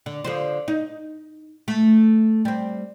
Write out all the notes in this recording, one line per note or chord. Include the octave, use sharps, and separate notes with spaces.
D3
D3 F3 C5
D#4
A3
G3 C4